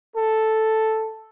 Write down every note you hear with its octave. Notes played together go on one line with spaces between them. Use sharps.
A4